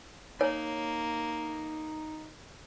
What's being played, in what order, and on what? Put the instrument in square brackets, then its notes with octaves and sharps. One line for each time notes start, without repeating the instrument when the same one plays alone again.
[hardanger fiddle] A#3 [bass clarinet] D#4 [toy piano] C#5